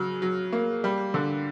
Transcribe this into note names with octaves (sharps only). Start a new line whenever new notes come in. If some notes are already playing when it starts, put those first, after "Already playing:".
Already playing: C#3 F#3
F#3
A#3
G3
D3